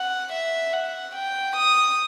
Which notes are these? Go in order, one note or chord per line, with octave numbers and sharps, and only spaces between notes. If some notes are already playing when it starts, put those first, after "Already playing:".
Already playing: F#5
E5
F#5
G5
D#6